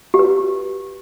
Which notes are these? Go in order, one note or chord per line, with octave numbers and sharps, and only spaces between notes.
G4
B4
G4